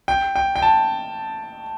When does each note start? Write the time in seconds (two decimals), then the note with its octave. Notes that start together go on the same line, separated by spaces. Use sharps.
0.08 G5
0.36 G5
0.56 G5
0.62 A5